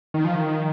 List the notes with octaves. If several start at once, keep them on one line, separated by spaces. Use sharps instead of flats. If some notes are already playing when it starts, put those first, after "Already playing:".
D#3
F3
D#3